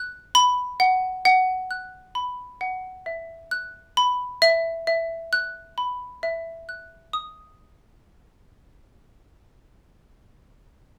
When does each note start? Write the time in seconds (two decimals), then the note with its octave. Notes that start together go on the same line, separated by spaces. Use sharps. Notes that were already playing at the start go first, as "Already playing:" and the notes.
Already playing: F#6
0.35 B5
0.80 F#5
1.25 F#5
1.71 F#6
2.15 B5
2.61 F#5
3.06 E5
3.51 F#6
3.97 B5
4.42 E5
4.87 E5
5.33 F#6
5.78 B5
6.23 E5
6.69 F#6
7.13 D#6